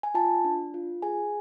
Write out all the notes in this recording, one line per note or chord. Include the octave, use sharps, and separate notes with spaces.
G#5
F4 A5
D4
F4
G#4 G#5